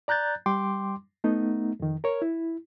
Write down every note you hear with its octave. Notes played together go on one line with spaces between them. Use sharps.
D5 A#5 F#6 G6 A6
G3 G5 C6 D6
A3 B3 D#4
F2 D#3
A#4 C#5
E4